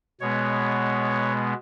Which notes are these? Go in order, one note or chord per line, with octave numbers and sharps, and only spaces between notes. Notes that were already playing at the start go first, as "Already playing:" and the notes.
B2 G#3 B3 C#5